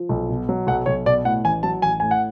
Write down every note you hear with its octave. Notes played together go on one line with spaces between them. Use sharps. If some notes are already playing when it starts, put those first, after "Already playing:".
Already playing: F3
B1
B2
F#3
B1 F#5
B1 C#5
B2 D5
A2 F#5
A1 G#5
F#3 A5
A1 G#5
A2 G#5
F#5